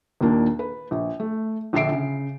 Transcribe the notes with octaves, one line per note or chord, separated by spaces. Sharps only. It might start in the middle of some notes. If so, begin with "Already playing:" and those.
D#2 A#2 A#3 D4
B4
A#1
A3
A#1 D3 E5 C7 D7
C#3